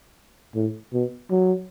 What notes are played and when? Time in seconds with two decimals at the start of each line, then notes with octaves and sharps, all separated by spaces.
0.55 A2
0.93 B2
1.31 F#3